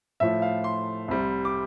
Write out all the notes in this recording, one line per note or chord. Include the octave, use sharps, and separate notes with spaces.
A2 F3 A3 E5
F5
C6
C2 C3 G3
D6